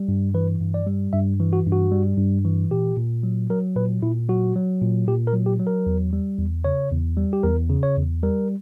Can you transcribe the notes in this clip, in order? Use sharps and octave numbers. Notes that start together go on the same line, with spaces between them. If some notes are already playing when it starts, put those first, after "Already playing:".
Already playing: G3
G2
E3 B4
G2
D5
G3
G2 E5
E3
F#4
G2
F#4
G3
G2
E3
A#2 G4
A#2
F#3
F#3 A#4
A#2 B4
A#2 E4
F#3 F#4
F#3
A#2
A#2 G4
A#4
F#3
G4
F#3
A#4
E2
G3
E2
C#3 C#5
E2
G3
G4
E2 A#4
C#3
C#5
E2
G3 A#4